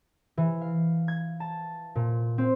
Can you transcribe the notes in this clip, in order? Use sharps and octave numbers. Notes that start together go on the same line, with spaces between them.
E3
F5
G#6
A5
A#2
C4